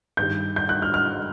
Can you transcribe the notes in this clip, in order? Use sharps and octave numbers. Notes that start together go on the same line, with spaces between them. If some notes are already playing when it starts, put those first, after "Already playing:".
G2 D#3 G3 G6
G6
F#6
F6
F6